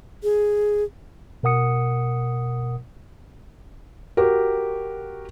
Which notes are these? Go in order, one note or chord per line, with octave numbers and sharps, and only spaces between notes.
G#4
B2 A#4 F#5 D#6 C#7
F#4 G4 A#4